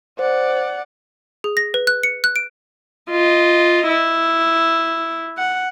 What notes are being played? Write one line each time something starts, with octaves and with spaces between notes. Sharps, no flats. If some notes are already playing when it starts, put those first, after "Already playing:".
C5 D5 F#5
G#4
A#6
B4
F#6
C#7
F#6
D7
F4 D#5
E4
F#5